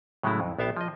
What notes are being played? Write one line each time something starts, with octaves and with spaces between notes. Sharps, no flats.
A2 C#3 F#3 G#3 A3 E4
F2
A#1 B3 E5 F5 G5 A5
F3 D#5